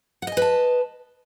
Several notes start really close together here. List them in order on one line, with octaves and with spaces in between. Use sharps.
F#5 D#5 G#5 B4 A5